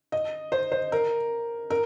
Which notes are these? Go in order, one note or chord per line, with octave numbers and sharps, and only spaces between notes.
D#5
C5
C5
A#4
A#4